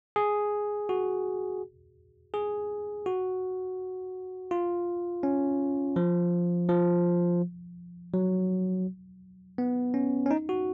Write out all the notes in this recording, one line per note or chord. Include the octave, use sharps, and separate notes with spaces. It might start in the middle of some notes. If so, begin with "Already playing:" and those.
G#4
F#4
G#4
F#4
F4
C#4
F3
F3
F#3
B3
C#4
C#4
D#4
F#4